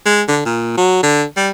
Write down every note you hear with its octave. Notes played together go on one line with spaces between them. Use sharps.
G#3
D3
A#2
F#3
D3
G3